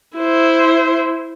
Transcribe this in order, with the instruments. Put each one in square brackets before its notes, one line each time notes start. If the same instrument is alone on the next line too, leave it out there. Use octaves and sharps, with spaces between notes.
[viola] E4 C5